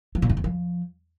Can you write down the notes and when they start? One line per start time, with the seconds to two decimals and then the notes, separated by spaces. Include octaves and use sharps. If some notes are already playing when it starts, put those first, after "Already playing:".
0.15 F3
0.22 A#2
0.30 F#2
0.37 E2
0.44 F3